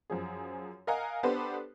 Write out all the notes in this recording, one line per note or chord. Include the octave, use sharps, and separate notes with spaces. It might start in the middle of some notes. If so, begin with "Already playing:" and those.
F#2 F3 G#4
A#4 D#5 F5 F#5 G#5 A#5
B3 D4 G4 A4 B4 C5